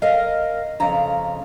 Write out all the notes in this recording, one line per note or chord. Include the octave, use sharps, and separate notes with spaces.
A#4 D#5 F5
F2 C#3 A#5